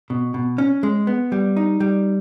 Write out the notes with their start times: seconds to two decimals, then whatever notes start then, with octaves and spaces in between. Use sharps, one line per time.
0.10 B2
0.34 B2
0.58 C#4
0.83 G#3
1.07 B3
1.32 G3
1.57 D#4
1.80 G3